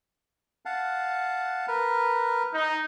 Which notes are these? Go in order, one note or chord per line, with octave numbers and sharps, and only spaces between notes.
F5 F#5 A5
A#4 B4
D#4